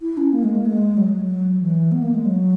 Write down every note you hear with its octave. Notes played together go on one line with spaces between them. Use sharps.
E4
C#4
A#3
G#3
A#3
G#3
F#3
G#3
F#3
E3
B3
A#3
G#3
F#3